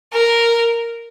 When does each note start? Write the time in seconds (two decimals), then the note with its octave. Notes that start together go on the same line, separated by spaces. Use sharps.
0.13 A#4